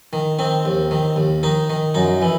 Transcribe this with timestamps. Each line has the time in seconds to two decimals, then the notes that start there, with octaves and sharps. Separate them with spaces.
0.13 D#3
0.39 D#3 C4
0.65 D#2
0.91 D#3
1.16 D#2
1.43 D#3 D#4
1.70 D#3
1.95 F#2 D#4
2.22 E3